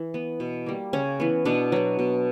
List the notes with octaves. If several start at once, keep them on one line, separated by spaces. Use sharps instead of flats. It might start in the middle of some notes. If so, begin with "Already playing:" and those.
Already playing: E3
B3
B2
G3 A#3
C#3 C#4
E3 B3
B2 B3 D4
F#3 B3
B2